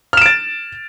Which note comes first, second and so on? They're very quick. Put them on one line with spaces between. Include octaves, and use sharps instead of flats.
F6 E7 D7 A6